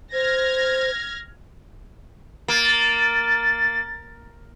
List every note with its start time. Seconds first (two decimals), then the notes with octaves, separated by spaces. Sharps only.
0.13 C5 F6 G#6 A#6
2.48 A#3 A6